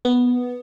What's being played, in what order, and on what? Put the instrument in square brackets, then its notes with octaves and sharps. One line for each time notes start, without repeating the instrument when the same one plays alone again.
[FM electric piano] B3